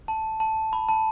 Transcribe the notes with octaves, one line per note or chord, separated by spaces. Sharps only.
A5
A5
B5
A5